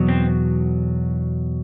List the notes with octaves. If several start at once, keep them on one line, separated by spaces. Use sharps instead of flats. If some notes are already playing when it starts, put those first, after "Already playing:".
Already playing: E2 B2 F#3
C4